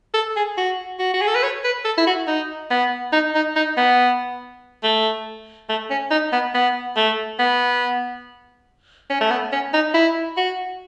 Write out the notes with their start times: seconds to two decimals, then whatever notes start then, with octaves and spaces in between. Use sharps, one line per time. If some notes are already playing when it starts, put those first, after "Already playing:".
0.14 A4
0.36 G#4
0.57 F#4
0.99 F#4
1.14 F#4
1.21 G#4
1.28 A4
1.35 B4
1.43 C#5
1.64 B4
1.85 A4
1.98 E4
2.07 F#4
2.27 D#4
2.71 B3
3.12 D#4
3.35 D#4
3.56 D#4
3.77 B3
4.83 A3
5.69 A3
5.90 C#4
6.11 D#4
6.32 B3
6.54 B3
6.96 A3
7.39 B3
9.10 C#4
9.21 A3
9.30 B3
9.52 C#4
9.74 D#4
9.94 E4
10.37 F#4